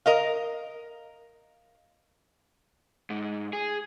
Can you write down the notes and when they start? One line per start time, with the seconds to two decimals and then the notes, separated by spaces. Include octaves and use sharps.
0.06 A#4 D#5 F5
3.10 G#2
3.53 G#4